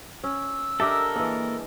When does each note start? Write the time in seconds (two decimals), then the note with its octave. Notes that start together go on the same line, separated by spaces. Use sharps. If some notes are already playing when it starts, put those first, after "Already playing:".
0.24 C#4 E6
0.80 D4 G4 A4 A#4 D#5 E5
1.16 E3 G#3 A#3